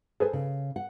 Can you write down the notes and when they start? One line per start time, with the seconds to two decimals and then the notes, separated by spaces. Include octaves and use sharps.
0.20 G#4 A4 B4 C5 G#5
0.33 C#3
0.76 F#5